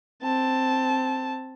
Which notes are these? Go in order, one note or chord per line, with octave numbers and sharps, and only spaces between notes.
C4 A5